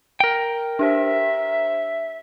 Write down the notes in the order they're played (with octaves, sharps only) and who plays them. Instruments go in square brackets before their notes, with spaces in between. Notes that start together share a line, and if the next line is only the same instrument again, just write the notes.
[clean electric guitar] A#4 G5
[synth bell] D4 G4 C5 [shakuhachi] E5